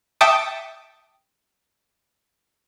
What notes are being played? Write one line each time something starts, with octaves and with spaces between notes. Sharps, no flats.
E5 G5 A5 D6 D#6 C#7